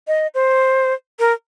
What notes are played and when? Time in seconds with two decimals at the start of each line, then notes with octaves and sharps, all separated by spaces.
0.07 D#5
0.34 C5
1.19 A#4